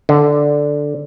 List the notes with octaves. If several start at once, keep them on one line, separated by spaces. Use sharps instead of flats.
D3